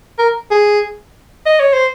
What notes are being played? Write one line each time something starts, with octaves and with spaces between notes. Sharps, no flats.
A#4
G#4
D#5
C#5
C5